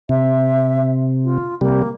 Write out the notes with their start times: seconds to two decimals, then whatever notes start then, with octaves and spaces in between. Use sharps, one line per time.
0.09 C3 E5
1.24 F4
1.61 C3 G3 A#3